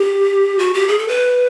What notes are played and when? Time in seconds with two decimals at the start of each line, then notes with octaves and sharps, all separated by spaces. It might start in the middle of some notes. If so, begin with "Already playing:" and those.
Already playing: G4
0.59 F#4
0.74 G4
0.88 G#4
0.98 A4
1.08 B4